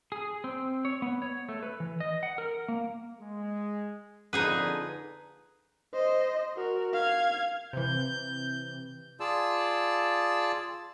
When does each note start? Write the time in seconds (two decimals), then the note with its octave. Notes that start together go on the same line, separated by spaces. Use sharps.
0.12 G#4
0.44 C4
0.85 C#5
1.02 B3
1.22 C#5
1.49 A3
1.63 B4
1.80 E3
2.00 D#5
2.23 F#5
2.38 A#4
2.68 A#3
3.20 G#3
4.33 F2 A#2 D3 D#4 G#4 B4
5.93 C5 D#5
6.56 F#4 A#4
6.94 F5 G#6
7.73 C3 E3 G6
9.20 F4 G#4 D5 A5 E6